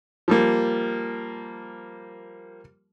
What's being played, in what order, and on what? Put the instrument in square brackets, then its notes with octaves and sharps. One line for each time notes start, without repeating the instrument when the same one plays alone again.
[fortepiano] F3 G3 A#3